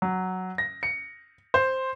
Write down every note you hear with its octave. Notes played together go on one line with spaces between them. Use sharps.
F#3
A#6
C#7
C5